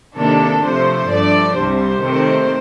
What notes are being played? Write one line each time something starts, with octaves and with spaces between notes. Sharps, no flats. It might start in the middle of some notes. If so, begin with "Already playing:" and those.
C3 D#3 A#3 D4 A4
C3 F3 A3 C5
G2 F3 A3 D4 D5
C2 C3 G3 C5
C3 D#3 A3 C4